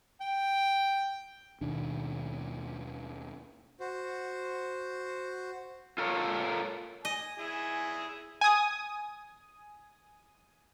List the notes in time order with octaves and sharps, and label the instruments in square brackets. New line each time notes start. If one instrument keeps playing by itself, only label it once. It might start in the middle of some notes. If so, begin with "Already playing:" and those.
[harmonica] G5
[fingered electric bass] D#2 B2 D#3 D4
[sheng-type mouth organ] F#4 C5
[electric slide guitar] F4 A4 A#4 C#5
[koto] D#5 [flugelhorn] G#5
[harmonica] E4 G#4
[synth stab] G#5 D#6